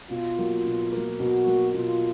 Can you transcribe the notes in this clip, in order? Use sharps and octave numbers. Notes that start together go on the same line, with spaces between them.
B2 F4
F#3 A#3
B2
F#3 A#3
B2 F#4
F#3 A#3
B2 F4